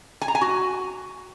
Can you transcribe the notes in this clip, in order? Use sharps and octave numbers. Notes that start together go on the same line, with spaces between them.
G#5
A#5
G#5
F#4